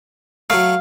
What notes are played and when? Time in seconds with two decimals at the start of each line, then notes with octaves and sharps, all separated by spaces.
0.50 F#3 A3 F5